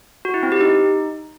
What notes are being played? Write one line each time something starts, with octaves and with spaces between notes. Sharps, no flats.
F#4
E4
C4
G4
D#4